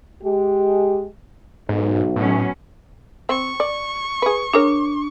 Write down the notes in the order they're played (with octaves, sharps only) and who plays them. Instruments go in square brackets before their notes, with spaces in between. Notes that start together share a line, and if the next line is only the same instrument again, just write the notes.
[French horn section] G#3 G4
[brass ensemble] B1 [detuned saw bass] G#2
[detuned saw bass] A2 [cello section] F#3 B3 C#4
[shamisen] C4 [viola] C#6
[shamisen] D5
G#4 B4
[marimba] D4 [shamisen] G#4 A#4 C#5